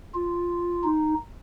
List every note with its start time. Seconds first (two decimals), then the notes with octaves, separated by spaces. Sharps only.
0.15 F4
0.84 D#4